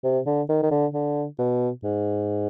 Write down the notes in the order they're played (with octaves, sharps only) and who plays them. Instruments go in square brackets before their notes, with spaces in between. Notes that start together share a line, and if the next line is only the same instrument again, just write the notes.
[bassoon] C3
D3
D#3
D#3
D3
D3
B2
G#2